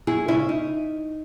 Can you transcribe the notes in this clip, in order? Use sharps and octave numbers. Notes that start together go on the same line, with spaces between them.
F#2 E4 G#4
C#3 G#3 C#4 E4
D#4